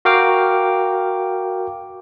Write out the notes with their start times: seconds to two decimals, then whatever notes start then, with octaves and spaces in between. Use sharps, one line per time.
0.05 F#4 A#4 F5 G5 D6 F6